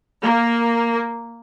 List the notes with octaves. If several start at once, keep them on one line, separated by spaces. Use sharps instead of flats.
A#3